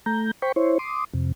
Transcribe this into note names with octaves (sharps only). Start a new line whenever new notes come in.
A3 A#5 G6
C5 G5 B5 C#6
E4 C5 C#5
C6 D6 D#6
F2 C3